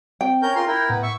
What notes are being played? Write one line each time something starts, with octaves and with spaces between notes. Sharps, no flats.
C4 G5
C#4 A#4 G6
F4 G#4 A#4 C6
E4 A#4 G6
A2 B3
E5 C#6